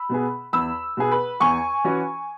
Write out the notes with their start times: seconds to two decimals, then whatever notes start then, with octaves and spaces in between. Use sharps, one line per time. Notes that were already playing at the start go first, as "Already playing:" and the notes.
Already playing: B5 E6
0.09 B2 B3 G#4
0.53 E2 B5 E6
0.97 B2 B3 G#4
1.12 B4
1.40 E2 G#5 C#6
1.84 E3 C#4 F#4